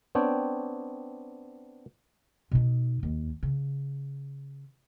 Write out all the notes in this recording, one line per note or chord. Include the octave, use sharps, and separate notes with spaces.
B3 C4 D4 C#5 G5
B2 D#4
D#2
C#3